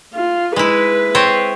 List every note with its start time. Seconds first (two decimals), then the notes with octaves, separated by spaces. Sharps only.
0.14 F4
0.56 G#3 E4 B4
1.15 C4 C5 C#5